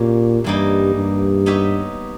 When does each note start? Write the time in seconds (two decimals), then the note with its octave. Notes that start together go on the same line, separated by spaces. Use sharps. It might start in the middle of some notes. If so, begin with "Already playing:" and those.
Already playing: A#2 A#3 C#4 G4 C#5
0.44 G2 E3 G3 A#3 D#4
0.95 G2
1.46 B3 D#4 G4 C#5 E5